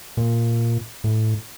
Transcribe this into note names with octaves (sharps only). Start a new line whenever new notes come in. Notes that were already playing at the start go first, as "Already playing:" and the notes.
A#2
A2